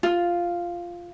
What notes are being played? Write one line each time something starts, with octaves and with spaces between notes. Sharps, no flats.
F4